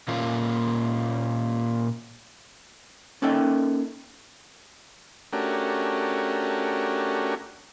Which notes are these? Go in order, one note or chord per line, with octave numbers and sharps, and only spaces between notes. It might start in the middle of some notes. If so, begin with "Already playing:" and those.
A#2 A#3 C#4 F4
A#3 C#4 D#4 A4 E5 G5
A3 C#4 D4 F#4 G4 A#4